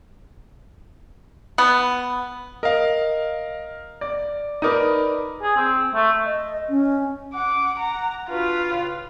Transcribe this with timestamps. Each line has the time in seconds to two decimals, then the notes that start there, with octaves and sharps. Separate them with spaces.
1.58 B3
2.63 A#4 D#5 F5
4.01 D5
4.62 D#4 A#4 B4 D5 D#6
5.43 G#4
5.57 C4
5.95 A3
6.25 D#5
6.69 C#4
7.34 F#5 D6
7.79 A#5
8.30 D4 F4 F#4 B4
8.68 A2 C#3 B4